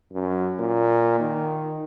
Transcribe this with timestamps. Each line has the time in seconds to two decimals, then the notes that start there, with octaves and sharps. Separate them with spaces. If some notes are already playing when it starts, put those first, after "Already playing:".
0.13 F#2
0.59 A#2
1.20 D#3